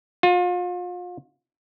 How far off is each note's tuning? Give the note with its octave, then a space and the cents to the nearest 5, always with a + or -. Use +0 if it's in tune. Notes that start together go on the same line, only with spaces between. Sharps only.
F4 +35